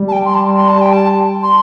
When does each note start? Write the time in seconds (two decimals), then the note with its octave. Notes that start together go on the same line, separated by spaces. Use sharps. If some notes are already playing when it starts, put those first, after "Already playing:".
Already playing: G3
0.08 A5
0.12 G5
0.26 C6
0.34 A5
0.56 C6
0.69 A5
0.81 G5
0.93 A5
1.43 C6